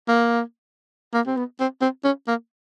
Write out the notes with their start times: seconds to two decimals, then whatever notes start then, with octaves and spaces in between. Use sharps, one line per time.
0.08 A#3
1.14 A#3
1.27 C4
1.37 B3
1.60 C4
1.81 C4
2.04 C#4
2.27 A#3